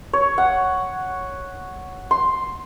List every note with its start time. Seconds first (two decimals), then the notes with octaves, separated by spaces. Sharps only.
0.13 C#5
0.38 F#5
2.11 C6